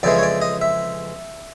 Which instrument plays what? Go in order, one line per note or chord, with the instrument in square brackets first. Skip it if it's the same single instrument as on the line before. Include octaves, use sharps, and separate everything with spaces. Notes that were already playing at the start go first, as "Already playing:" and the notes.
[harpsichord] F2 C#3 E3 G#3 D5
C#5
D5
D#5
E5